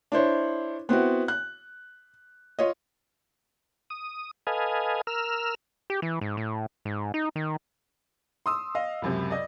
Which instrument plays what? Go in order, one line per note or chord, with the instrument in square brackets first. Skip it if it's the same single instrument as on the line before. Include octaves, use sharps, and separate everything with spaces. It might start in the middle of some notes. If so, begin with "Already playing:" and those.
[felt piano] D4 E4 C5 C#5
B3 C4 E4 F#4
F#6
F4 C#5 D#5
[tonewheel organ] D#6
A4 B4 D#5 F5 G#5
A#4 E6 F6
[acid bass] G4
E3
G#2
A2
G#2
D#4
D#3
[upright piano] C6 D#6 E6
D#5 F5
C#2 F#2 C3
D5 D#5